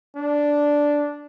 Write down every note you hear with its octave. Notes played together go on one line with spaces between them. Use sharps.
D4